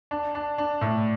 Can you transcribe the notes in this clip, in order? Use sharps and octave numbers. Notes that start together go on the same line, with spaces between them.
D4
D4
D4
A2